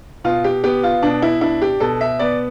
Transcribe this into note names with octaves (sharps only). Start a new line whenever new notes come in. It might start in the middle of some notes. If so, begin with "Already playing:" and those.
B2 F4
G4
B3 G4
F4
B2 D4
E4
D4 E4
G4
B2 A4
E5
B3 D5